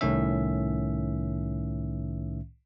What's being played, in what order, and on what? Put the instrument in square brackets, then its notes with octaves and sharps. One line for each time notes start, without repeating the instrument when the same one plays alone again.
[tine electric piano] C2 A2 D#3 C#4 E5